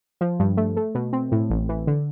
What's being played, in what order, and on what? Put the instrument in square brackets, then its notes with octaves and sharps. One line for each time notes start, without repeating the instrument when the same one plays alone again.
[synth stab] F3
G2
A3
A3
B2
C4
A2
A1
E3
D3